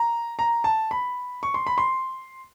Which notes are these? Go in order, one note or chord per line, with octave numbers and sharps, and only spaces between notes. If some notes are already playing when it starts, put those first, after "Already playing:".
Already playing: A#5
A#5
A5
B5
C#6
C6
B5
C6